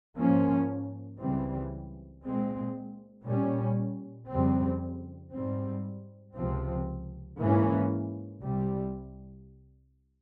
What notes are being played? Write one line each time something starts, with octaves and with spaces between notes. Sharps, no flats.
G#2 F3 A#3 C#4
C#2 C#3 E3 G3 C4
A#2 G#3 C4
A#2 G3 C#4
F2 C#3 G3 C4
G#2 G3 C4
C#2 C3 F3 C4
G#2 E3 A#3 C#4
C2 C3 G3